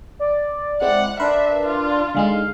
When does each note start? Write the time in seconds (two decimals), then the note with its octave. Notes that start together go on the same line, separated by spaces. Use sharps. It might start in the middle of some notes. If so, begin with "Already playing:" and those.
0.19 D5
0.81 G#3 C4 E4 F#5
1.20 D4 A#4 B4 E5 C6
1.66 F4
2.15 D3 G#3 D#4 F5